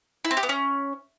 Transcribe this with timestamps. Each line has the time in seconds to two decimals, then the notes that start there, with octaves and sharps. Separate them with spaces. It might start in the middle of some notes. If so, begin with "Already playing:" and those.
0.25 E4
0.31 C4
0.37 G4
0.43 B3
0.49 C#4